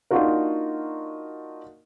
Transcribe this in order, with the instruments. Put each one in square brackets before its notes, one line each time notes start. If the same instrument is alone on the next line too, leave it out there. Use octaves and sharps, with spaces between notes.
[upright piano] A#3 D4 D#4 F4 F#4 A#4